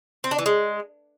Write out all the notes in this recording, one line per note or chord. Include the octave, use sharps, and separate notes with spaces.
C4
D4
E3
G#3